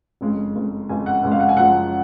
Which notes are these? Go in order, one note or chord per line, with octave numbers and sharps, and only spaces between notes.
F#1 F2 C#3 G#3
F#1 F2 C#3 G#3
F#1 F2 C#3 G#3 G#5
F#5
F#1 F2 C#3 G#3
F5
F#5
G#5
F#1 F#2 C#3 F3 G#3 F#5